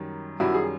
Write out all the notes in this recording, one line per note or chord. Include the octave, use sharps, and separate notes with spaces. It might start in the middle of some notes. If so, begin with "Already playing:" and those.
Already playing: F#2 D#3 G3
F#2 D#3 G3 E4 F#4
G#4